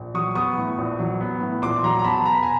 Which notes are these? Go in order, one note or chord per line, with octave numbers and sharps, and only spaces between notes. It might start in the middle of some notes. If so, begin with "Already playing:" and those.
Already playing: A#1
F#3 C#6 D#6
B3 C#6 D#6
A2
A#1
F#3
B3
A2
A#1 C6 D6
F#3 A#5 C6
A#5
B3 A5 B5
B2 A#5
B5
G#5 A#5